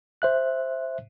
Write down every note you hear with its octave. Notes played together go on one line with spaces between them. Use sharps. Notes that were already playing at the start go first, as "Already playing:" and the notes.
C5 E5 F#6